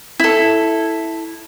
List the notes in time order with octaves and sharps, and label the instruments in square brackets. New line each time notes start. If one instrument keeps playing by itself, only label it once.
[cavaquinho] E4 A4